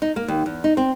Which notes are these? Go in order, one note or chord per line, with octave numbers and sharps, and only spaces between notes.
D#4
A#3
D#2
E2
D#4
C4